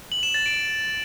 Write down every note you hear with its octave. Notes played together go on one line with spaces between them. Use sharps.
F#7
E7
A6
D7